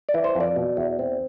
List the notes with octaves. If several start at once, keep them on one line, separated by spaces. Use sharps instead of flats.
D5
E3
C5
F2
D5
B2
E2
C4